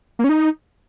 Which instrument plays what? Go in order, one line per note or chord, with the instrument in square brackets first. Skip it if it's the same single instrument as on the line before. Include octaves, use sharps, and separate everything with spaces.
[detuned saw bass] A#3
C#4
D#4